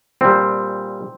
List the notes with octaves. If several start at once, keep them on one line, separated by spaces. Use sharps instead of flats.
A#2 G3 C4